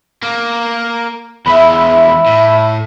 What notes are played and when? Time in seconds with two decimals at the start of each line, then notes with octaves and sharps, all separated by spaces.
0.23 A#3
1.46 E2 G#3 E5 B5
2.26 A2